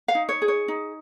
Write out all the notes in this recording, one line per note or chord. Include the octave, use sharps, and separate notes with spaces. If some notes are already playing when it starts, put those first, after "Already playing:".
F5
D#4
C#5
G#4
C#5
D#4